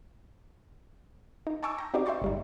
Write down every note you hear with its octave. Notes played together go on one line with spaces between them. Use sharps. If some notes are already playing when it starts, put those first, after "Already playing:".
D#4
G#5 A5 C#6 D6 E6 G#6
G5 A#5
C4 D#4 F#4 G4 B4 D5
E5 G5 C6 C#6 A6
G1 G3 D#4